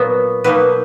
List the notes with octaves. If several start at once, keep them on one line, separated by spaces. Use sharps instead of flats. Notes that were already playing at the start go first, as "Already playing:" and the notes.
Already playing: A#2 F#3 B3
B2 F#3 A#3 D#4 B4